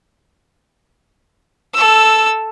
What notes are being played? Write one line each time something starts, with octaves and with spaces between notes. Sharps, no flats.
A4 E6